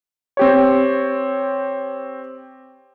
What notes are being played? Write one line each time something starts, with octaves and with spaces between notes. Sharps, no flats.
C4 G4 C#5